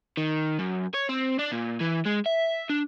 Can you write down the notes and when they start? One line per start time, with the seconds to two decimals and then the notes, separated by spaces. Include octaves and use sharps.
0.17 D#3
0.59 F#2
0.94 C#5
1.09 C4
1.39 D4
1.52 A#2
1.80 E3
2.05 G#3
2.26 E5
2.70 D4